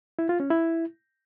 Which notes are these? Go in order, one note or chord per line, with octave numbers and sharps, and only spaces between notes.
E4
F4
C#4
E4